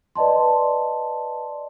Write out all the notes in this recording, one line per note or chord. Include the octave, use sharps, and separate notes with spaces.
B4 D5 D#5 A5 C6